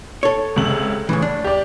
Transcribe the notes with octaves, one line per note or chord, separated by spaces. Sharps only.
A4 C#5
C#2 C3 F#7
A2 C#3 E3
D4
G4 D5